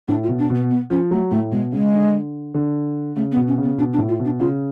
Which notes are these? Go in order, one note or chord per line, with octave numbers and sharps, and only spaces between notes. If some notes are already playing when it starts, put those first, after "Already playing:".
A2 D4
F4
B2
D4
B2 B3
B3
F3 C#4
F#3 A3
A2 A3
B2 G#3
C#3 G#3
D3
D3
C#3 A3
B3
B2
C#4
C#3
B3
B2 D4
D4
A2
F4
B2
D4
C#3 F4